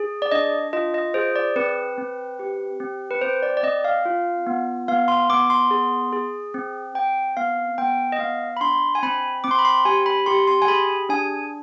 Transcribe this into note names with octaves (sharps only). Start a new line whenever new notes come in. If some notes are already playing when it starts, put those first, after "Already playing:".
Already playing: G#4
D5
D4 D#5
F4 D#5
D#5
G#4 C5
D5
C4 B4
C4
G4
C4
B4
C4 C5
D5
D5
C4 D#5
F5
F4
B3
B3 F5
C6
B3 D6
C6
G#4
G#4
C4
C4 G5
B3 F5
B3 G5
D#5
B3 F5
B5
D4 C6
G#5
C4 B5
C4 D6
C6
B5
C6
G4 G#5
B5
G4 C6
C6
G#5
G#4 B5
D4 G#5